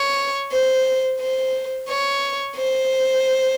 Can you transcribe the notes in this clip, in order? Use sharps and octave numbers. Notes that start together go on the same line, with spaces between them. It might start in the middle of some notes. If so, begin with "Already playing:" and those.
Already playing: C#5
C5
C5
C#5
C5